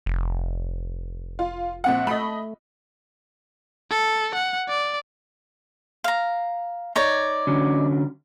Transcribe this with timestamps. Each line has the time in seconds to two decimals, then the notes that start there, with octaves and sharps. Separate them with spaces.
0.06 F1
1.39 F4
1.84 A#1 C4 F#5
2.07 A3 D#5 B5
3.91 A4
4.35 F#5
4.69 D5
6.04 F5 A#5
6.96 D#4 C#5 D5
7.47 D3 F#3 C#4